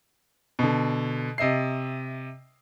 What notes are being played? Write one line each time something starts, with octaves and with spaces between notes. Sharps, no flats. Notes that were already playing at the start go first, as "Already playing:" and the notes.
B2 D3
C3 D#5 E5 C7